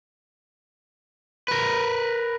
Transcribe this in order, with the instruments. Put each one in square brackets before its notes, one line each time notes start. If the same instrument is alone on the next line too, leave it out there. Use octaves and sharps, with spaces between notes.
[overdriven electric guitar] A#4 B4